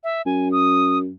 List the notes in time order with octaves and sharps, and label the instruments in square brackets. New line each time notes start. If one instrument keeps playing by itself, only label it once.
[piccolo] E5
[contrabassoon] F#2 [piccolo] G#5
[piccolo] D#6